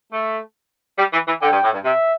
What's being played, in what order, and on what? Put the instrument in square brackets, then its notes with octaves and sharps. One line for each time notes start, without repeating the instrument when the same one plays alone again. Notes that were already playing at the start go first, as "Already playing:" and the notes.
[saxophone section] A3
G3
E3
E3
[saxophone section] D3 [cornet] G5
[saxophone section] G2
A2
G2
[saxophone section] C3 [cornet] E5